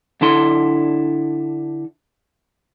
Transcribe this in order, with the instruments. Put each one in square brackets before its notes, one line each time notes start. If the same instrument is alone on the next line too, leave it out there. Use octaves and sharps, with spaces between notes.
[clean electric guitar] D3 D4 E4 A4 C6